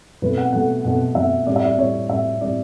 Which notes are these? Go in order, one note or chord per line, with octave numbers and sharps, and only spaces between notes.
B2 F#3 A3 B4
F#5
B2 F#3 A3 F#5
B2 F#3 A3 F#5
B2 F#3 A3 E5
A2 G3 C#4 D5
E5
D5
A2 G3 C#4 C#5
A2 G3 C#4 E5
A2 G3 C#4 D5